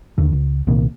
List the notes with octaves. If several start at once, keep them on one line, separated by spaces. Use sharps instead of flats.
D#2 D3
C#2
C2 A#2 D#3 A#3